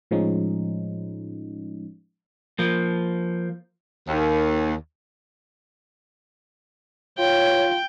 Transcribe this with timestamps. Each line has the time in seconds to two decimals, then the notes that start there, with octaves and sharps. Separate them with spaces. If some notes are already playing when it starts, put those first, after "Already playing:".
0.11 A2 F3 G#3 C#4 D#4
2.59 F3 A#3
4.07 D#2
7.18 F4 C#5 G5